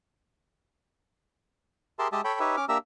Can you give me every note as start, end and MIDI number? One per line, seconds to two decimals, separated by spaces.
1.99 2.08 67
1.99 2.08 68
1.99 2.08 70
1.99 2.08 76
1.99 2.08 81
1.99 2.08 84
2.12 2.21 56
2.12 2.21 67
2.12 2.21 75
2.12 2.21 76
2.12 2.21 81
2.25 2.39 69
2.25 2.39 73
2.25 2.39 79
2.25 2.39 83
2.40 2.56 63
2.40 2.56 67
2.40 2.56 71
2.40 2.56 73
2.40 2.56 76
2.57 2.65 61
2.57 2.65 86
2.57 2.65 89
2.69 2.78 58
2.69 2.78 62
2.69 2.78 67
2.69 2.78 76
2.69 2.78 82
2.69 2.78 88